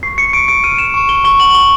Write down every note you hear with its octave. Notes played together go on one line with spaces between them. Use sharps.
C#6 C7
C#7
C#6 D7
D7
F6 D#7
E7
C#6
G7
C#6 G7
F#7
C#6 G7